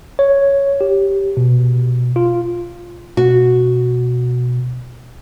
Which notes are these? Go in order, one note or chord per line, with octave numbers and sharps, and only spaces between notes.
C#5
G4
B2
F4
B2 F#4